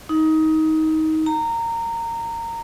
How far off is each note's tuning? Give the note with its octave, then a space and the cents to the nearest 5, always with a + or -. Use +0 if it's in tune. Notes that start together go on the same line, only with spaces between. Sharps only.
D#4 +20
A#5 -20